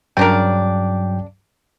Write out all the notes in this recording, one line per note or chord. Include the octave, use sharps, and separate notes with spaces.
G2 C#3 F#3 D4 A#4 G5